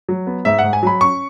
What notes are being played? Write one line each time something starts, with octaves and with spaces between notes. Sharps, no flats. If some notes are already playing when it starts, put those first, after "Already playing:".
F#3
B3
G#2 E5
G#2 F#5
G#5
F#3 B5
C#4 C#6